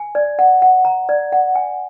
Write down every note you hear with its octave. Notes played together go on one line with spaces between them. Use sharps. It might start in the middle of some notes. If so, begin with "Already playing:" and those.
Already playing: G#5
D5
F#5
F#5
A#5
D5
F#5
G#5